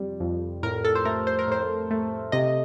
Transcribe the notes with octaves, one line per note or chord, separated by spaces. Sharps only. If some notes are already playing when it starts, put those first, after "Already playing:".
Already playing: F2 C3 G3
F2
A2 A#4
A4
C5
A3 A#4
C5
A#4
A2 C5
A3
C3 D#5